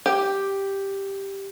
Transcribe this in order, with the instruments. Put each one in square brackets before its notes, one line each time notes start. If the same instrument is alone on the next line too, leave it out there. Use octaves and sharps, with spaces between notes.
[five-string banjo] G4